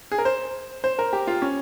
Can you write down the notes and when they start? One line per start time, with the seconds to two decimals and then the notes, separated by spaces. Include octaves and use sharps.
0.12 G#4
0.18 A#4
0.25 C5
0.84 C5
0.99 A#4
1.13 G4
1.27 F4
1.42 C#4